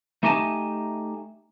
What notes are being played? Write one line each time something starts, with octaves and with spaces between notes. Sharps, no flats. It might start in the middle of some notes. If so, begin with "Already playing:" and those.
A3 D#4 G4 D#5 G#5 A5